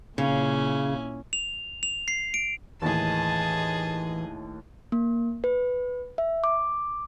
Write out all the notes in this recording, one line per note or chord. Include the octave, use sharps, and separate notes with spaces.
A#2 C#3 C#4 E4
F7
F7
C7
D7
D#2 A2 E3 G#4 D#5 A5
A#3
B4
E5
D6